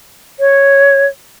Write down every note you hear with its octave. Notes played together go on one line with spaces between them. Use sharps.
C#5